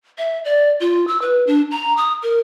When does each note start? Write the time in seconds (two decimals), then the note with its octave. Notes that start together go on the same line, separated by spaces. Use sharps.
0.18 E5
0.45 D5
0.80 F4
1.08 E6
1.22 B4
1.47 D4
1.71 A#5
1.97 D#6
2.23 A#4